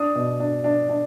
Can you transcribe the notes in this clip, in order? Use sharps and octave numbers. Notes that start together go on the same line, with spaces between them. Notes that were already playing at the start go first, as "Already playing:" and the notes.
Already playing: D4 D#6
B2
D4
D4
D4